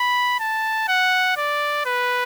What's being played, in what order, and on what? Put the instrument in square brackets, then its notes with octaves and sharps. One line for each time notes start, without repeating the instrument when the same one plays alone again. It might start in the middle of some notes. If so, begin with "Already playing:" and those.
Already playing: [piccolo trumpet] B5
A5
F#5
D5
B4